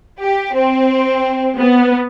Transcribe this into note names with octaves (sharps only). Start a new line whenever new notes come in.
G4
C4
B3